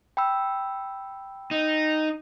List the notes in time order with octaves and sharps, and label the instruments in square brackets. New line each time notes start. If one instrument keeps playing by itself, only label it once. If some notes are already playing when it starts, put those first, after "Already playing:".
[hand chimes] G5 B5 E6
[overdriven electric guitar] D#4